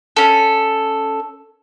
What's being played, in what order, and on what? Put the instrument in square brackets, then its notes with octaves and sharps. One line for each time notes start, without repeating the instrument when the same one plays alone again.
[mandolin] C#4 A4